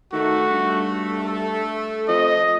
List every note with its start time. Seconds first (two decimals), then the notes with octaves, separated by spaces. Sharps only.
0.13 D#3 A3 F#4
0.50 G2
1.26 A4
2.09 F2 D#5